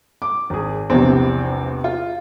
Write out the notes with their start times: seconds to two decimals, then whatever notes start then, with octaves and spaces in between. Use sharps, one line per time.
0.22 D6
0.50 G#1 G#4
0.90 A#1 E2 C3 C4
1.84 F4